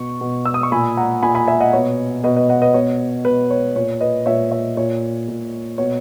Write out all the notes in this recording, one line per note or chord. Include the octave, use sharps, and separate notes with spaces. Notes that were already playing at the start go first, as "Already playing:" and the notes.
Already playing: B2 C#6
B2
E6
D#6
C#6
A#2 G#5 B5
F#5 A#5
A#2 G#5 B5
G#5 B5
E5 G#5
D#5 F#5
B2 C#5
B2 B4 D#5
B4 D#5
D#5 F#5
B4 D#5
B2 C#5
B2 B4
C#5
A#2 C#5
B4 D#5
A#2 C#5 E5
C#5 E5
A#2 C#5
A#2
B2 C#5